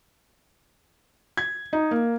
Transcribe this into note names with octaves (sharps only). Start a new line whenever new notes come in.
G#6
D#4
A#3